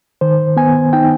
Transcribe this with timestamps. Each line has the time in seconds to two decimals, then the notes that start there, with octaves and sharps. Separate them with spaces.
0.21 D#3 C5
0.57 B3 G#5
0.93 D#4 G5